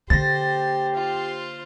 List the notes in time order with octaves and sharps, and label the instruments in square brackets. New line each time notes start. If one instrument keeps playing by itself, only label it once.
[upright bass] D3 A#3 [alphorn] G4 [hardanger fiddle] C5 [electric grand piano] A6 A#6
[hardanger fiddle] F4 C5